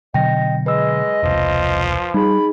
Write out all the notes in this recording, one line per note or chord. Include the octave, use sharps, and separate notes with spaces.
B2 D3 F#3 D#5 G5 A#6
G#3 B4 D#5 E6
E1 C2 F3
G3 D#4 G#4 B5